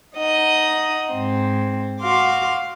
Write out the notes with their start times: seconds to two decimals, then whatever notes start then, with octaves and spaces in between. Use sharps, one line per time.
0.17 D#4 D#5 F#5
1.14 G#2 C4
2.01 F#4 F5 C6 D6